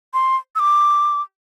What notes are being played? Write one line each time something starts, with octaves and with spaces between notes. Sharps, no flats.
C6
E6
D6